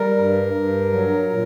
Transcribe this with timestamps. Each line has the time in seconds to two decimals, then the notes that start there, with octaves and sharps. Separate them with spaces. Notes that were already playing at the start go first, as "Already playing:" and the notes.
Already playing: G3 A#4
0.17 G2
0.54 G2
0.92 F#3
1.30 A#2